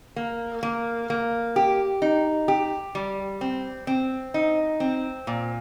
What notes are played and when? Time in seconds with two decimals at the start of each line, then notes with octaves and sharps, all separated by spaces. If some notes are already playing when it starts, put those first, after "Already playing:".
0.16 A#3
0.63 A#3
1.10 A#3
1.56 G4
2.02 D#4
2.48 G4
2.95 G3
3.41 C4
3.87 C4
4.34 D#4
4.80 C4
5.27 A#2